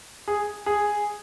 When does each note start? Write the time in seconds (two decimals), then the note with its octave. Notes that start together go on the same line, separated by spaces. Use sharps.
0.28 G#4
0.66 G#4